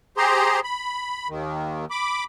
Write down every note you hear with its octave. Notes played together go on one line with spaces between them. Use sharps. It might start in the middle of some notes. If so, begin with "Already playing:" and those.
G4 G#4 C5 A#5 C6
B5
D#2 D#3
B5 D6